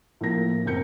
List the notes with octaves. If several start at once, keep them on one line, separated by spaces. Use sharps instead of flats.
A2 F3 A#3 A#4 A#6
F#1 C4 A#4 G6 C#7